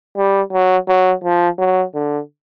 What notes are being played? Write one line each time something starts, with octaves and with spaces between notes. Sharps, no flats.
G3
F#3
F#3
F3
F#3
D3